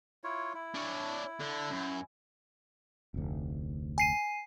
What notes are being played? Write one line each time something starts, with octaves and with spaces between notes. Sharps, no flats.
E4 F4 C#5
E4
D4 C#5
D3
F#2
F1 D2
G#5 C7 D#7